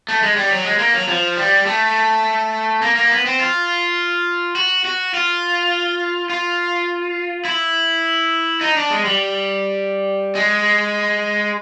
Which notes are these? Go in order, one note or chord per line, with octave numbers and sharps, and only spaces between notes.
A3
G#3
G3
F#3
G#3
A#3
F#3
F3
G3
A3
A#3
A#3
B3
C4
F4
F#4
F#4
F4
F4
E4
D#4
D4
G#3
G3
G#3